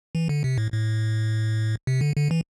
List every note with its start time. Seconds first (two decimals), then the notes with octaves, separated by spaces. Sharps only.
0.15 E3
0.29 D3
0.44 C3
0.58 A2
0.72 A2
1.87 C3
2.01 D3
2.16 D3
2.31 E3